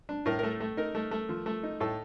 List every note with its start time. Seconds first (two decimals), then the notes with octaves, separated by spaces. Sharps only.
0.09 D4
0.26 A2 A#4
0.39 A3 A#4
0.60 A3
0.77 D#4 A#4
0.95 A3
1.11 A3
1.29 F3
1.46 A3
1.63 D#4
1.80 A2 A4